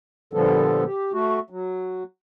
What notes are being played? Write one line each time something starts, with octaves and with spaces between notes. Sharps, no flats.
A#2 D3 F3 G3 B3 A4
G4
A3 F#4
F#3